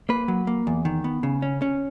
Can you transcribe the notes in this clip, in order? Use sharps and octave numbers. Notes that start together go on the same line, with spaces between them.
A#3 B4
F#3
A#3
E2
D#3
B3
C#3
C#4
C#4